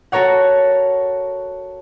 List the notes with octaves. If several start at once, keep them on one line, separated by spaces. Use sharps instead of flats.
F#4 A4 A#4 C#5 F#5